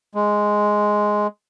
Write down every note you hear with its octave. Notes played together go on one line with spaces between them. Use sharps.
G#3